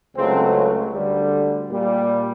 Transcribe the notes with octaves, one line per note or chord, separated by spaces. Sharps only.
C#2 C#3 F#3 A3 C4
D2 D3 G3
A#2 G3